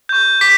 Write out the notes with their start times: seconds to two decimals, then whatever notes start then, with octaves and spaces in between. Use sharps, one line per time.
0.09 C#6 G6
0.41 D6 B6